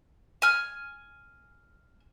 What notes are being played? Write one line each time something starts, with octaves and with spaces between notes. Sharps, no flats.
G#5 F6